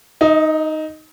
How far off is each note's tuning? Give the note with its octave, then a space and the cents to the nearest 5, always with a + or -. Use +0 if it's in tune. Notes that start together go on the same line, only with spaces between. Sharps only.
D#4 +0 D#5 +45